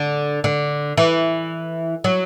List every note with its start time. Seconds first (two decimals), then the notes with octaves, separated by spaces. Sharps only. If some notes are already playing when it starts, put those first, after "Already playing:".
Already playing: D3
0.44 D3
0.97 E3
2.04 F#3